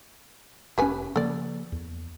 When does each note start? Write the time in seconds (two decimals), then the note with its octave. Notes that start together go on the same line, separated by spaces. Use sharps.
0.78 F1 C#4 G4 B4 G#5
1.16 C#3 F3 A#3 A4 D5
1.72 E2